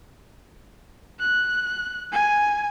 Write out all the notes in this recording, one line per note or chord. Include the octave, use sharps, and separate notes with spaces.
F#6
G#5